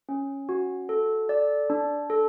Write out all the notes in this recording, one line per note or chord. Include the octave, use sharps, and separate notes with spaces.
C#4
F#4
A4
D5
D4
A4